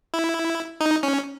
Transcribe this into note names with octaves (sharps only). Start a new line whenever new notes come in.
E4
D#4
C#4